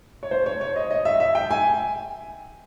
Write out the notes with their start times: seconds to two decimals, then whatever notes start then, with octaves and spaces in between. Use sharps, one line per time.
0.23 C#5
0.31 C5
0.46 C#5
0.61 C#5
0.76 D#5
0.91 D#5
1.05 E5
1.20 E5
1.35 G5
1.51 G#5